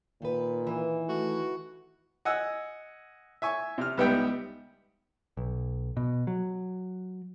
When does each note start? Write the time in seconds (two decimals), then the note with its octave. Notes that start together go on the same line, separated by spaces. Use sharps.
0.22 A#2 D#3 B4
0.67 E3
1.09 A3 F#4
2.25 D#5 F#5 G#5 E6
3.42 E5 G#5 C#6
3.78 C3 F6
3.97 C#2 G3 B3 D#4 E5 G5
5.37 B1
5.97 B2
6.27 F#3